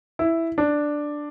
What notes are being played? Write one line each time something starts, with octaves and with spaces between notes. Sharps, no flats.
E4
D4